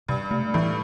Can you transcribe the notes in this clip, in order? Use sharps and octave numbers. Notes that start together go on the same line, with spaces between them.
G2 C3
G2 A3
A2 E3